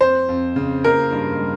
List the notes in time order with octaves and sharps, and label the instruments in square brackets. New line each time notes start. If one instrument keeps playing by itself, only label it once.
[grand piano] F2 [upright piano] C5
[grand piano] F2
C#3
[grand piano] A#3 [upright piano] A#4
[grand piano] G2
G3